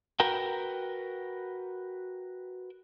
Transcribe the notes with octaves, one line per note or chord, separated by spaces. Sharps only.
F#4 A#4 B4 G5